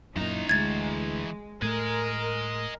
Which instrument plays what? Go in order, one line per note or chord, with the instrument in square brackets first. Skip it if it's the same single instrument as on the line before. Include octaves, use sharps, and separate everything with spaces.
[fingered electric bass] F#2 A#2 [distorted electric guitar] E3 A#5 [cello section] D#4
[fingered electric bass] D2 [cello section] G#3 [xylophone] G#6 A6
[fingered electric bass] A2 A3 [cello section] A#4 [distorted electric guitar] D#5 G#5